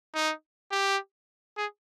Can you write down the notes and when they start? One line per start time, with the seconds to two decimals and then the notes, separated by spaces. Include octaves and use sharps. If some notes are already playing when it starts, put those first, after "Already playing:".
0.15 D#4
0.71 G4
1.57 G#4